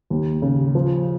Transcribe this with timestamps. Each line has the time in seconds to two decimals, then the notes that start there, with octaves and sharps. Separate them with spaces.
0.10 D#2
0.42 C#3
0.75 F3